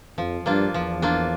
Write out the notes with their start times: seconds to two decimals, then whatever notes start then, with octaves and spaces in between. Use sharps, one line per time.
0.18 F2 F3
0.46 G2 A#3 D4 F4
0.74 E2 F3
1.02 A#3 D4 F4